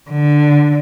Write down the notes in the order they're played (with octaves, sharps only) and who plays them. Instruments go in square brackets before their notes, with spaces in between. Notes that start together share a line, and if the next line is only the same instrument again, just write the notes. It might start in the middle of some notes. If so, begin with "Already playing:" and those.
[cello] D3